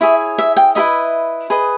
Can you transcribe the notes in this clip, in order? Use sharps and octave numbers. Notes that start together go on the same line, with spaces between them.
E4 G#4 C#5 E5
E5
G5
E4 G#4 B4 D#5 E5
G#4 B4 D#5